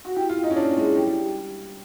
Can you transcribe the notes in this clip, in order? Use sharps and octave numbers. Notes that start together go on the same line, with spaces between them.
F#4
E4 G4
F4
E4
D#4
C#4
D4 C#5
G#3 E4
G3 G5
G3